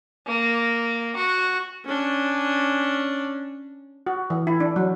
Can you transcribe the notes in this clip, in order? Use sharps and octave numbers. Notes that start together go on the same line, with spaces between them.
A#3
F#4
C#4 D4
F#4
E3
E4
D4
F#3